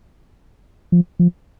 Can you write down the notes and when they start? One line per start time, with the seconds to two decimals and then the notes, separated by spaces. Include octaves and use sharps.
0.92 F3
1.19 F3